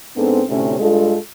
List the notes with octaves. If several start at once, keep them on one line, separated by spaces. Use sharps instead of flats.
G#2 B3 C4 D4 A4
D2 A2 C3 C#4
G2 G#3 F4 A4